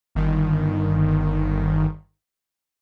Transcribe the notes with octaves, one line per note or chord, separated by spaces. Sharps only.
G1 D#3